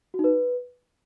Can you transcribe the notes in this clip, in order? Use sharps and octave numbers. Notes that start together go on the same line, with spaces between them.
F#4
D#4
B4